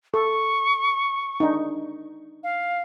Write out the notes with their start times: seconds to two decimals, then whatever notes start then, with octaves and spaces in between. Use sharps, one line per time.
0.14 A4 C#6
1.40 D4 D#4
2.43 F5